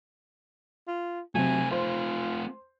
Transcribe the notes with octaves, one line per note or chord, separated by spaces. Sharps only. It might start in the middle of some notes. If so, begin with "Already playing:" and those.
F4
C3 F#3 A3 C4 G#5
F4 C5 C6